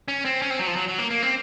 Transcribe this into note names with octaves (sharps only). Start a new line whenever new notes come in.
C#4
C4
C#4
C4
F#3
F3
F#3
F#3
A#3
A#3
C4